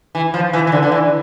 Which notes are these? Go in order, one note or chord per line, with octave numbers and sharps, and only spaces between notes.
E3
F3
E3
E3
D3
D3
E3